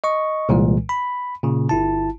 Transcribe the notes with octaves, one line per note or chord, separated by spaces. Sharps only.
D#5 C#6
C2 A#2 E3 G#3
B5
A#2 C#3
G1 E4 A5